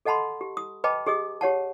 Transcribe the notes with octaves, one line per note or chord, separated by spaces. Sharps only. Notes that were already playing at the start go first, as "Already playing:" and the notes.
A4 D#5 F#5 A5 B5 C6
G4
D#6
B4 D#5 G5 A5 B5 D6
G4 G#4 D#5 D#6
G4 C#5 F#5 A5